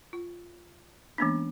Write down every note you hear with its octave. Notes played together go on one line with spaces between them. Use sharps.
F4
E3 G#3 A#3 B3 C#4 D4